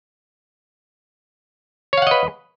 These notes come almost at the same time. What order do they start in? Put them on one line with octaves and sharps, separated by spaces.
C#5 F5 F#5 D#5 B4